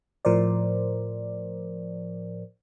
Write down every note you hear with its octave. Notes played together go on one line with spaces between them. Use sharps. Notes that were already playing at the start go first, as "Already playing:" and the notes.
A2 F3 A#4 C5 D5